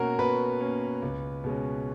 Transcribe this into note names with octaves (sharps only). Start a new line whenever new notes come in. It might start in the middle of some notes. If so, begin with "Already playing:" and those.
Already playing: B2 A#3 C#4 F#4 A#4 A#5
B2 B4 B5
A#3 C#4
C#2
B2 G#3 C#4